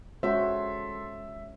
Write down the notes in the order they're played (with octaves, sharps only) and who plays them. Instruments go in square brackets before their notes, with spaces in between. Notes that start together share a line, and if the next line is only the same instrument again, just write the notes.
[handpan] G#3 C#4 C#5 [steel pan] F#4 C5 [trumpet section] A4 C6 [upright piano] E5